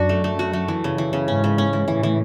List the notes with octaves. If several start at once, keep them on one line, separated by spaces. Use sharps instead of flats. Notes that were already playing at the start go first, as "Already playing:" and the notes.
Already playing: F#2 D4 F#4
A3
A3
F#4
A3
E3
C#3
E3
C#3
G#2 C#4
C#3
C#4
E3
A2 E3
E3